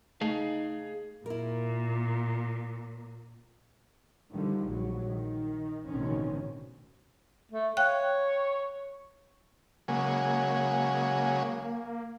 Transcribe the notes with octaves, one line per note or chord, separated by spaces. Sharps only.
A3 D#4 G#4 F5
A#2 E4 A#4
D3 D#3 F3 G3
A#1 F#3 G3
D#3
A1 B2 D3 D#3 C4 C#4
A3
C#5 F5 G5 F#6
C#3 F#3 G#3 A#3